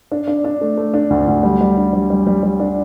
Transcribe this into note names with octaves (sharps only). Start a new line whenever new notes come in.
D4
D4
D4
A3
A3
D4
D2
D2
G3
G3
D4
G3
G3
G3
G3
D4